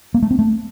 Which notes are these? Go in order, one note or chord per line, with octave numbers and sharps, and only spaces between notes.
A#3
A3
C4
A3